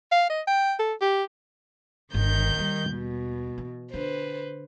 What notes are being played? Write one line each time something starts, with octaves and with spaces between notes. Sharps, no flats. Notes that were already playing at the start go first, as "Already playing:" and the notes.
F5
D#5
G5
A4
G4
G1 D3 D#3 G6
D#2 G3
B2
E3
D3 B4 C5